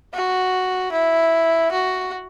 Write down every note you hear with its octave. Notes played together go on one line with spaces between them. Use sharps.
F#4
E4
F#4